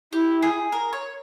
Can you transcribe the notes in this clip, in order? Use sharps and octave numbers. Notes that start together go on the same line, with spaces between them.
E4 G4
G#4
A#4
C#5